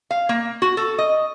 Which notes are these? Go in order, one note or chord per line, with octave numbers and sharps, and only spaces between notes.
F5
A#3
F#4
A4
D#5